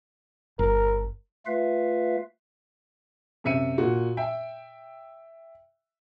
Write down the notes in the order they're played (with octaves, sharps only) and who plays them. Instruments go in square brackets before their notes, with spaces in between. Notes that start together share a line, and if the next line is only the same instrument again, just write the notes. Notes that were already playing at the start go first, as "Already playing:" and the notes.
[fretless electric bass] G1 [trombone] A#4
[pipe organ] A3 F4 B4 E5 F5
[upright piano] F#2 C3 E5 C#7 D#7
A#2 F#4
E5 G5